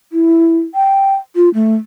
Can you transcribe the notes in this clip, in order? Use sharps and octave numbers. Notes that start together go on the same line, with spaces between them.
E4
G5
F4
A3